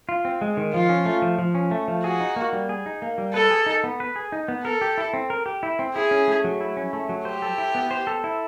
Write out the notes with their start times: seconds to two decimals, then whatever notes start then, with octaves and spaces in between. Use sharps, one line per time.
0.09 F4
0.25 C4
0.41 G#3
0.57 D#3
0.74 F3 F4
0.89 C#4
1.06 A3
1.22 F3
1.39 F3
1.55 C#4
1.71 A3
1.88 F3
2.04 F#4 G#4
2.21 D#4
2.36 A#3
2.53 G3
2.69 G#4
2.86 D#4
3.02 A#3
3.18 G3
3.34 A4 B4
3.51 G#4
3.66 D#4
3.84 B3
4.00 B4
4.16 G#4
4.32 D#4
4.48 B3
4.64 A4 A#4
4.81 G4
4.98 E4
5.14 C4
5.30 A#4
5.46 G4
5.63 E4
5.79 C4
5.95 E4 G#4
6.11 C#4
6.28 A3
6.44 F#3
6.61 E4
6.77 C#4
6.93 A3
7.09 F#3
7.25 G4 C5
7.42 A4
7.58 E4
7.75 B3
7.91 C5
8.07 A4
8.24 E4